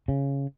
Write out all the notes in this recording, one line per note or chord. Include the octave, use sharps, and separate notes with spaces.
C#3